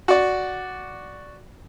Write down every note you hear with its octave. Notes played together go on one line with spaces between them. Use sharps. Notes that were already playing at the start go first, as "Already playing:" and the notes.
F#4 D5